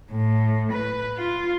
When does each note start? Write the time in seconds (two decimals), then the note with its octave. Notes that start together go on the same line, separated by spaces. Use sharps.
0.11 A2
0.72 B4
1.17 F4